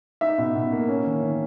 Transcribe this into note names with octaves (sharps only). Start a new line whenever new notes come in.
D#4 E5
B2
B2
A#3
C#4
D#3
D#3